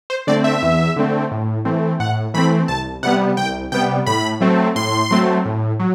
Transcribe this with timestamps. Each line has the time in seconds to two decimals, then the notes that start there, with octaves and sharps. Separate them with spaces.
0.10 C5
0.27 D3 A3 C4 D5
0.44 E5
0.62 E2
0.96 D3 A3 C4
1.31 A2
1.65 E3 A3 C4
2.00 A2 F#5
2.34 E3 A3 C4 B5
2.68 C2 A5
3.03 C3 G3 B3 F#5
3.37 C2 G5
3.72 C3 G3 B3 G5
4.07 A2 B5
4.41 F#3 A3 C4
4.75 A2 C6
5.11 F#3 A3 C4
5.45 A2
5.80 F#3